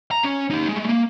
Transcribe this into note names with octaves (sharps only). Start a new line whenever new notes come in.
A#5
C#4
D#4 G4
G#3 A3
A#3